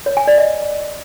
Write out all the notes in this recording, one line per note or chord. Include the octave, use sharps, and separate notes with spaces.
C#5
G#5
D5
D#5